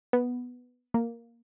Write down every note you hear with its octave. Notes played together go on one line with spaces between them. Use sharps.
B3
A#3